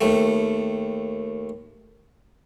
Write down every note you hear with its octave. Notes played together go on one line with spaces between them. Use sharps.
D#2 A3